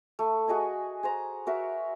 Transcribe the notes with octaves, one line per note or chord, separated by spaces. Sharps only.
A3
F#4 G#4 D#5 G#5
G#4 C5 A#5
F#4 A#4 E5